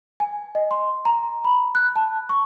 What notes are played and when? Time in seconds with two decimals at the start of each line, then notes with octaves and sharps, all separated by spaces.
0.20 G#5
0.55 D#5
0.71 C6
1.05 A#5
1.45 B5
1.75 F#6
1.96 A5
2.29 C#6